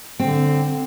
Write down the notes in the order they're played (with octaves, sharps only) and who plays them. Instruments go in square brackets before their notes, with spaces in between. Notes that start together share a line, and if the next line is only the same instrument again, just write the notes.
[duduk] D3 [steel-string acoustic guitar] C4